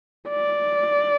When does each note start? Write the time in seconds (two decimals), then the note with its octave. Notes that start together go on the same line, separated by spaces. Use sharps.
0.29 D5